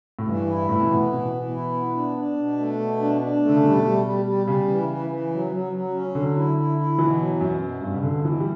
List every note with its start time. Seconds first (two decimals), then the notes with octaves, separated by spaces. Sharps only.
0.19 A2
0.28 G2 E3
0.49 E4
0.69 A2 E3
0.81 B2
0.90 A2 B3
1.12 B2 E3
1.33 E3
1.54 E4
1.74 B3
1.95 D4
2.17 D4
2.38 B2
2.58 A3
2.79 B2
3.00 D4
3.21 D4
3.42 A3
3.49 D3
3.56 C#3
3.64 B2 G3
3.84 G3
4.05 G3
4.25 G3
4.46 C#3 G3
4.68 E3
4.89 E3
5.10 E3
5.31 F#3
5.52 F#3
5.72 F#3
5.94 C#4
6.15 D3 F#3
6.36 E4
6.57 E4
6.78 E4
6.99 B2 E3
7.19 F#3
7.41 F#2 B2
7.61 B2
7.82 G2 B2
7.94 C#3
8.03 B2 D3
8.25 B2 E3
8.40 G3